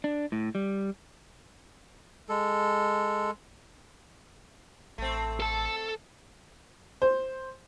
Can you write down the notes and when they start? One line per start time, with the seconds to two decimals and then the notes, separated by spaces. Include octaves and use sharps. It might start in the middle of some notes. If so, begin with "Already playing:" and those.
0.04 D4
0.32 A2
0.55 G3
2.29 G#3 A4
4.98 A1 A3 C4
5.40 A4 A5
7.02 C5